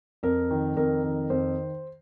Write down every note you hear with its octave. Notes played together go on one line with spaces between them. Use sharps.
F2 A#4
D#3
F2 A#4
D#3
F2 C5